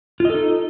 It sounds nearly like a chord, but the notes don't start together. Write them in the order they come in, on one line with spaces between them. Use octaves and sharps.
F4 D#5 A4 D#4